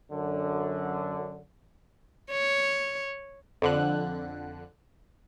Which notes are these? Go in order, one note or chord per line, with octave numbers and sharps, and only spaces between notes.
F#2 D3
C#5
F2 D3 F#6